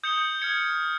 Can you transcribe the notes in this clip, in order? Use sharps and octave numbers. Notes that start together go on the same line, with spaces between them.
D#6 G6 C#7 G7
F6 G#6 C#7 G7